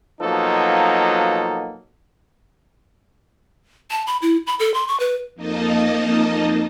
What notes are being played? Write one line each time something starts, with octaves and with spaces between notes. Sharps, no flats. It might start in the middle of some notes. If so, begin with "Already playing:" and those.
B2 F3 F#3 A#3 D#4 A4
A5
B5
E4
B5
A4
C6
C#6
B4
F2 A#3 D#4 D#5 A5